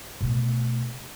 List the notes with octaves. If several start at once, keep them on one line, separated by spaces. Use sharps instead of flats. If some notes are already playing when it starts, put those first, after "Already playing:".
B2 A3